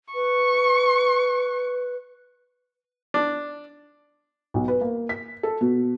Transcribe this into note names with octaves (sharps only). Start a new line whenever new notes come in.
B4 C#6
D4
B1
B4
A#3
B6
A4
B2